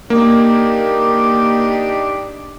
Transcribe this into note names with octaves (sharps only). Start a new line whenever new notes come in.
A#3 D4 D#4 G4